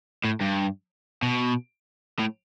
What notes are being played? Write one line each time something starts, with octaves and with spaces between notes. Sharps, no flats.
A2
G2
B2
A2